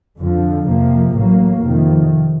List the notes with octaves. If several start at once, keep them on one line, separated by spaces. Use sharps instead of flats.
F2 D3 F3
F2 C3 F3 A#3
A1 A2 F#3 A#3
F2 C3 D#3